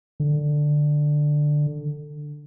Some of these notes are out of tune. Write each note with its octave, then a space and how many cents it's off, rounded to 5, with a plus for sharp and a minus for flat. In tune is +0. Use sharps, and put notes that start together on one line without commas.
D3 +10